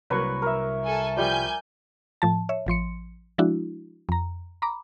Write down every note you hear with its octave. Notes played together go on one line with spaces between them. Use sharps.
C2 F#3 A#3 B4 C#6
A#4 E5
A4 G#5
F3 G3 D5 G#5 G6
A2 F3 A5
C#5 E5
A1 F3 C6 C#7
F3 G#3 D4 E4 F#4
F2 A#5
A#5 B5 D6